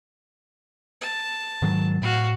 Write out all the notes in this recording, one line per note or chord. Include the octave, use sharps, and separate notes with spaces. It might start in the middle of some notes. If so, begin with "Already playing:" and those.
A5
G#2 D#3 F#3
A2 F#4 F5